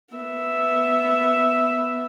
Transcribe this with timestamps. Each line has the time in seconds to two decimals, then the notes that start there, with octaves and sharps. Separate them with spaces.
0.14 B3 E5